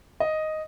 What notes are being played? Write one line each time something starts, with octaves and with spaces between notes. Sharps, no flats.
D#5